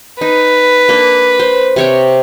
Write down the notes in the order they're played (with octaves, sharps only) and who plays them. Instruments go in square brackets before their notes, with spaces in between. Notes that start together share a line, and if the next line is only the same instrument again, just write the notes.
[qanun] D#4 [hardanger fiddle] B4
[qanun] A#3 D4
C5 C6
C3 C#5 G5